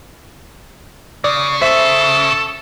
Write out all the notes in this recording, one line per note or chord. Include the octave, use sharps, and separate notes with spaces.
C#3 D5
A4 C5 E5